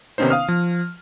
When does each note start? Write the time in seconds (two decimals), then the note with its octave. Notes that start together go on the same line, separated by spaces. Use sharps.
0.18 C3 D#3 B3 C#4 D#4 C5
0.30 F5 D#6 F6
0.48 F3